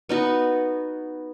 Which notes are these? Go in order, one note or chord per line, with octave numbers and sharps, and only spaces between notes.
B3 D#4 F#4